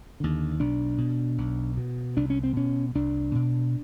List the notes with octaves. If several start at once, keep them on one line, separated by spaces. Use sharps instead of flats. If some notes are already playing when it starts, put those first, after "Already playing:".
D#2 D3
B1 D4
B2
B1
B2
C2 D4
C#4
C4
B2 C#4
C2 D4
B2